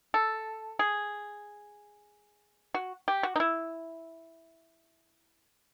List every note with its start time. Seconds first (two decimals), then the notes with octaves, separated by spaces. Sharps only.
0.14 A4
0.79 G#4
2.74 F#4
3.08 G4
3.23 F#4
3.36 D#4
3.40 E4